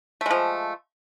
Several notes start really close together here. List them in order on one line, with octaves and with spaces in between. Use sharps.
A3 G#3 F3